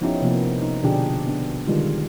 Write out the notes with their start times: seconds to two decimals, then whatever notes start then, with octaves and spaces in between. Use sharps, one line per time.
0.01 F3 B3 C#4 D#4 E4 G4
0.22 C3 F3 A#3 B3
0.62 D#4
0.82 B2 D3 F3 D4 G4 G#4
1.27 B3 D4
1.68 D3 D#3 G3 G#3 F4